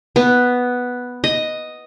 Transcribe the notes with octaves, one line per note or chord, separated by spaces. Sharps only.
B3
D#5